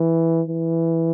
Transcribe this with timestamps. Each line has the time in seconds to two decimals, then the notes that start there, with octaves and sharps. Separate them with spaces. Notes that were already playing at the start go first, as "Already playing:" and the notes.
Already playing: E3
0.48 E3